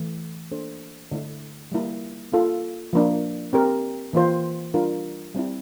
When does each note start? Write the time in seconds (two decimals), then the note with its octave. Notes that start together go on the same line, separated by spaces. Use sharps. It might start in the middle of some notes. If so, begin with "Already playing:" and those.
Already playing: E3 A3 E4
0.51 A#3 D4 A4 C5
1.12 D3 A3 E4
1.72 G3 A#3 E4
2.32 A#3 F4 A4
2.93 F3 A#3 D4
3.53 C4 G4 A#4
4.13 E3 A#3 F4 C5
4.74 G3 D4 F4 A#4
5.35 G3 C4 E4